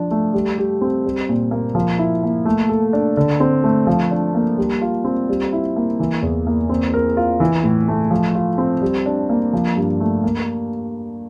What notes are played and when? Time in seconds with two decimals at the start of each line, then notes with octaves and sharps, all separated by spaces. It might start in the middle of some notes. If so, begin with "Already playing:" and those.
Already playing: F3 D4
0.11 A3
0.33 G3
0.58 G4
0.81 C4
1.05 G3
1.29 A#2
1.51 A#3
1.75 F3
1.98 E4
2.23 A#3
2.45 A3
2.69 A4
2.93 D4
3.17 D3
3.40 C4
3.64 A3
3.87 F3
4.11 D4
4.35 A#3
4.58 G3
4.81 F4
5.04 C4
5.29 G3
5.53 E4
5.76 A#3
6.00 E3
6.22 E2
6.47 A#3
6.69 C4
6.93 A#4
7.17 F4
7.40 E3
7.64 A2
7.88 A3
8.11 F3
8.35 F4
8.58 C4
8.82 G3
9.06 D4
9.29 A#3
9.53 F3
9.76 G2
10.00 A3
10.24 A#3